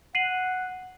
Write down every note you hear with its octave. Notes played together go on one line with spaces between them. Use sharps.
F#5 C7 D#7 F#7